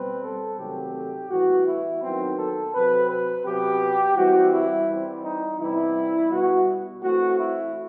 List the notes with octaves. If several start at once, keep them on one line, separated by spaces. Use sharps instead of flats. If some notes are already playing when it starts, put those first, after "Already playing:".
Already playing: B2 G3 C4 B4
A4
C3 D#3 F#3 A3 C4 G4
A2 E3 G3 B3 F#4
E4
D#3 F#3 B3 C4
A4
C3 F#3 C4 B4
B4
C3 F#3 B3 G4
E3 G3 C4 F#4
E4
E3 G3 C4
D#4
C3 E3 G3 B3 E4
B2 G3 B3 F#4
E3 A3 C4 F#4
E4